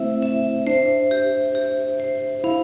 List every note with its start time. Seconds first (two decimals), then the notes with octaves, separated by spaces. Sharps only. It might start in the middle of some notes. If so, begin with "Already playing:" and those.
Already playing: A3 C4 E4 C5 E5
0.22 E5
0.67 D4 C5
1.11 G4
1.55 G4
2.00 C5
2.44 E4 F5